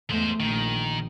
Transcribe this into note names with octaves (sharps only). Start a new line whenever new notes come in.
E2 G#3 A3 C5
A#1 D#3